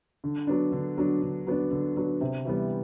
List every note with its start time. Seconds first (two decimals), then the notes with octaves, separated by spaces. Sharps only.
0.24 D3
0.47 F#3 B3 D4
0.72 D3
0.98 F#3 B3 D4
1.22 D3
1.47 F#3 B3 D4
1.71 D3
1.97 F#3 B3 D4
2.21 C3
2.45 E3 G3 B3